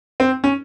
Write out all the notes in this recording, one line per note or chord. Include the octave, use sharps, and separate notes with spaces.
C4
C#4